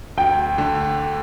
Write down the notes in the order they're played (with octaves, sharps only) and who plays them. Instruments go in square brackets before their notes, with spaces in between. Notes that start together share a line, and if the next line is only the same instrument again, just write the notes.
[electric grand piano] D2 [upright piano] G5
[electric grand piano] D3 A3